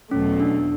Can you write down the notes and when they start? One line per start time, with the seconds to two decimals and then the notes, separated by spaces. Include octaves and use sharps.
0.11 E2 B2 F#3 A3 C#4
0.40 D4
0.59 D4